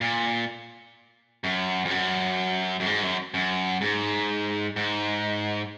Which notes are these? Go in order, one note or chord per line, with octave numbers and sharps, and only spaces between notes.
A#2
F#2
F2
F#2
F#2
G#2
F#2
F#2
G#2
G#2